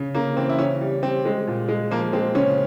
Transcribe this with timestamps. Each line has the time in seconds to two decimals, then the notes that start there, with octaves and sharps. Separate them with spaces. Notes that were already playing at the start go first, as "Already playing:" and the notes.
Already playing: C#3
0.15 C#3 A#3
0.37 E3 C4
0.49 E4
0.59 C#3 C#4
0.81 G3
1.03 G3 C4
1.25 G#3
1.47 A#2
1.68 G#3
1.91 F3 A#3
2.13 G#3 C4
2.35 C#3 C#4